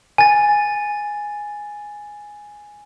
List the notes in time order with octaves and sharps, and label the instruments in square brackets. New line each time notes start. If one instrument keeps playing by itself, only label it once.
[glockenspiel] G#5 A6